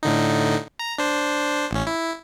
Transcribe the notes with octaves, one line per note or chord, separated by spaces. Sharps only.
A2 D3 D#4
A#5
D4 C5
A1 C#4
E4